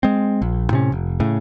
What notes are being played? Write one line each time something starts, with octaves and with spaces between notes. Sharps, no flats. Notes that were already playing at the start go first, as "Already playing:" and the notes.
G#3 C4
A#1
A2 C3 C#4
F1
A2 C#3